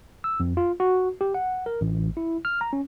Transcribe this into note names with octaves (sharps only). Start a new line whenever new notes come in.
E6
F2
F4
F#4
G4
F#5
A#4
A1
E4
F6
A#5
C#4